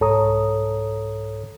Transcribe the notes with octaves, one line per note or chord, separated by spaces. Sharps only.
C2 G#2 A4 C#5 A#5 D#6